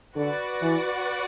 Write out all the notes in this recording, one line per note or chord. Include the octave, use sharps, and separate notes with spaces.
D3 F#4 B4 D5 F#5
E3